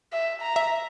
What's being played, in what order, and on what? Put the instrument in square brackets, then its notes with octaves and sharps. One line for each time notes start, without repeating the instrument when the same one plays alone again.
[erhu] E5
A#5
[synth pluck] E5